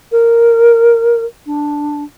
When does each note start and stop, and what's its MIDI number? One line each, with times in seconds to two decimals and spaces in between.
0.11 1.24 70
1.46 2.02 62